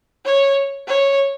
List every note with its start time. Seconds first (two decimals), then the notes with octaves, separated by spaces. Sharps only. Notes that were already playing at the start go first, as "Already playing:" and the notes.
0.25 C#5
0.87 C#5